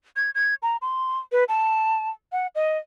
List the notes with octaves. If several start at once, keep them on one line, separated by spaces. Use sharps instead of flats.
G#6
G#6
A#5
C6
B4
A5
F#5
D#5